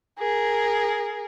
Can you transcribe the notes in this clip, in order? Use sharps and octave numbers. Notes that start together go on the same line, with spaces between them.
G#4 A#4